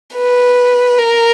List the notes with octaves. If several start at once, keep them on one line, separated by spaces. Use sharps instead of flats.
B4
A#4